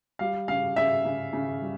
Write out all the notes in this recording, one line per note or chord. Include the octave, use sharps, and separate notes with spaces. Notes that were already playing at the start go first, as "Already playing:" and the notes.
G3 F5
C#3 F5
C#3 E5
C#3
C#3
G3